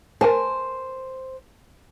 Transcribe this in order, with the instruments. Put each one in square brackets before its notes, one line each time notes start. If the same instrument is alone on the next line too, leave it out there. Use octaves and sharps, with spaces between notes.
[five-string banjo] A#4 G#5 A5 [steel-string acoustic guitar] C5